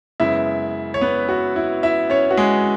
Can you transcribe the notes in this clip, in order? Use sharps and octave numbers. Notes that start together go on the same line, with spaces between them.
F#2 C#3 G#3 B3 E4 E5
C#5
B3 B4
F#4
E4
E4 E5
C#4 C#5
F#4
G#3 G#4